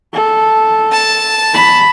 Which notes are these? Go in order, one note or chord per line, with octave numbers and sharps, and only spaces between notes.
A4
A5
B5